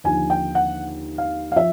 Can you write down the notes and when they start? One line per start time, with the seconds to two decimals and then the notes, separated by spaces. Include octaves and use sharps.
0.04 D#2 D3 F3 G#5
0.30 G5
0.55 F#5
1.18 F5
1.52 F5
1.56 F3 E5